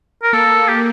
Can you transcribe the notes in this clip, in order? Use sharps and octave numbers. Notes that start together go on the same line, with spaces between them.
A#4
A#3 A4
G4